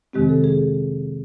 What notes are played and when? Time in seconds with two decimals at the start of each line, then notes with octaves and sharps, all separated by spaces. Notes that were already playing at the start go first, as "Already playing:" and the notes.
0.13 F2 C3 D#3 G#3 C4 G4
0.29 A4
0.44 G#4